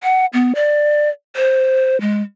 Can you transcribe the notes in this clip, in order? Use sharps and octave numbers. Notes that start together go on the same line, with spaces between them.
F#5
B3
D5
C5
G#3